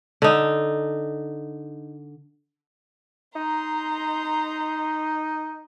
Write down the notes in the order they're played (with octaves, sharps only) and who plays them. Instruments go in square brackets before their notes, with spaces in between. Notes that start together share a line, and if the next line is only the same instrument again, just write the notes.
[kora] D3 D#4
[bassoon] D#4 [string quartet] A#5 C6